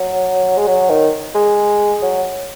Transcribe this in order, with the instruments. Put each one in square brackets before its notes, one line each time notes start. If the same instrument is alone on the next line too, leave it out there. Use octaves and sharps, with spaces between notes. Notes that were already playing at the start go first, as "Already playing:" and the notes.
Already playing: [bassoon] F#3
G#3
F#3
D#3
G#3
F#3